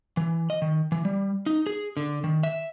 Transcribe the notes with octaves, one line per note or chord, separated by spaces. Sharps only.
E3
D#5
D#3
E3
G3
D#4
G#4
D3
D#3
E5